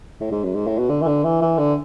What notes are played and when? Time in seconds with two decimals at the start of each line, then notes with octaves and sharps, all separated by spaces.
0.21 A2
0.32 G#2
0.44 F#2
0.55 G#2
0.67 A2
0.78 B2
0.89 D3
1.02 E3
1.07 D3
1.24 E3
1.42 E3
1.58 D3